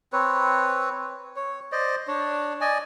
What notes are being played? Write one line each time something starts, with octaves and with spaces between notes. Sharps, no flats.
C4 B4 C#5
C#5
C5 D5 D#5
D4 C#5
D5 D#5 G#5